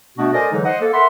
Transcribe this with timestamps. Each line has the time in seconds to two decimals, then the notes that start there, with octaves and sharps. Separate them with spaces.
0.18 B2 A3 B3 D4 F#4
0.33 A4 A#4 C5 D5 D#5 G#5
0.52 D3 E3 F#3 G#3 D#4 G#4
0.65 C5 D#5 F#5
0.81 A#3 A4
0.94 A#4 E5 F#5 B5 C6